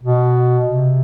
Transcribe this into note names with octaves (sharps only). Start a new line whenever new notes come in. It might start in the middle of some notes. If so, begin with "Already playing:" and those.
B2
C3